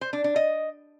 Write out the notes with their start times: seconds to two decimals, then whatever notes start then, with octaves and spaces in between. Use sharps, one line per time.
0.01 C5
0.13 D4
0.24 D4
0.36 D#5